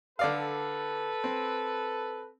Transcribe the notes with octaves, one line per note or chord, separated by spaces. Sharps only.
D3 A4 B4 D5 F5
C4